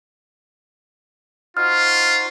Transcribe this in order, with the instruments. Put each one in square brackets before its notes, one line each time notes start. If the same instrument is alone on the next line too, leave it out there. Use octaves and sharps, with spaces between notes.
[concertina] D#4 F#4 C5 [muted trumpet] F4 [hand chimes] F6